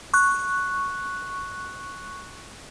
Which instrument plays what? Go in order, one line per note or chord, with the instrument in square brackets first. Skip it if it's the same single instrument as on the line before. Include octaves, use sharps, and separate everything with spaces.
[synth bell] C#6 F#6